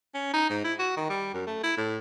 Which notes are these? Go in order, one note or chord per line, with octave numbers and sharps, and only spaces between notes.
C#4
D#4
G#2
E4
F#4
D#3
G3
F#2
A3
E4
A2